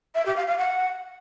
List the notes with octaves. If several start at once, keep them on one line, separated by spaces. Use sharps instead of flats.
E5
G4
F5
F5
F#5